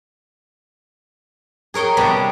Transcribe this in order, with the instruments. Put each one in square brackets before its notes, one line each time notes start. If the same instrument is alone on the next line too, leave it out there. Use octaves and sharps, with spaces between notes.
[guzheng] G#4 A#4 C#5 D#5 G5
C3 G3 B3 C#4 D4